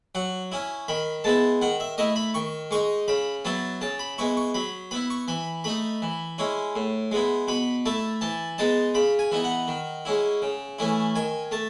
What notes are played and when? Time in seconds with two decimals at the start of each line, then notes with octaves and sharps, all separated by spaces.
0.15 F#3 F#5
0.52 C#4 E4
0.88 D#3 B5
1.24 G#3 B3 E4 A5
1.61 D#3 F#5
1.80 E5
1.98 A3 E4 D#5
2.16 B5
2.34 D#3 C#6
2.71 G#3 D#4 C#6
3.08 C#3 B5
3.45 F#3 B3 E4 A5
3.81 C#3 A5
3.99 B5
4.18 G#3 B3 E4 C#6
4.37 C#6
4.54 F#3 B5
4.91 B3 E4 B5
5.10 C#6
5.28 E3 B5
5.64 A3 D#4 B5
6.02 E3
6.38 G#3 C#4 E4
6.76 A2
7.12 G#3 B3 E4
7.48 B2 B5
7.86 A3 E4 A5
8.21 E3 A5
8.58 G#3 B3 D#4 A5
8.95 C#3 B5
9.19 G#5
9.32 E3 B3 D#4
9.44 F#5
9.68 D#3
10.05 G#3 C#4 E4
10.42 C#3
10.79 E3 A3 C#4 E4
11.16 D#3 G#5
11.51 A3 A5